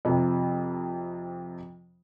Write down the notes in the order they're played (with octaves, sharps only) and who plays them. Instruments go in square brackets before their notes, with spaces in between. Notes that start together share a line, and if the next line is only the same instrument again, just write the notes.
[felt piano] F2 C3